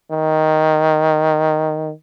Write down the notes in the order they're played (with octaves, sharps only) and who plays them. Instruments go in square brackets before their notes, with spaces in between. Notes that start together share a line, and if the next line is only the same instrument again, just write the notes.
[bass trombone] D#3